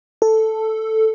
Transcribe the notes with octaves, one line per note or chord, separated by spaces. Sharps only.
A4